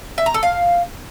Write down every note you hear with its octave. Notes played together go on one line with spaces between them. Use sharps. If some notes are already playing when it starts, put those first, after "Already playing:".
E5
A#5
A4
F5